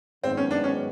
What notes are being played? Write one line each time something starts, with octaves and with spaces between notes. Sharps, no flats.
G#2 D#3 F#3 B3 C4
C#4
D4
C#4